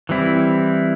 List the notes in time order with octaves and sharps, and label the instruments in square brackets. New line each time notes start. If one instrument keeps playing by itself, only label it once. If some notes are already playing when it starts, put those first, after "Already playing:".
[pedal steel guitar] E3 G3 C4 E4